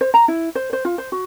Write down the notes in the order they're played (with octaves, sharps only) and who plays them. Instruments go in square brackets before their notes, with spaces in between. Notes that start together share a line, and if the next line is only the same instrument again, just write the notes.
[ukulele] C5
A#5
E4
C5
C5
F4
C5
F#4